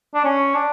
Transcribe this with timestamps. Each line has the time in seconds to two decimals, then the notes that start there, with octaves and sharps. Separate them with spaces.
0.14 D4
0.24 C#4
0.54 D4